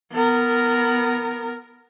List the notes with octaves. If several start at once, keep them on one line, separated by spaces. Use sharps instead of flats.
B3 A#4